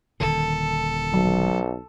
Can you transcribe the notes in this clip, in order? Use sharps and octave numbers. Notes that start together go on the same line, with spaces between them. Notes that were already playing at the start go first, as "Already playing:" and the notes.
D#1 D3 D#3 A4
B1 F#3